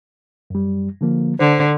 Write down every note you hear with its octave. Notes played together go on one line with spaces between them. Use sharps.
F#2 G3
D3 F3 A#3
D3 C5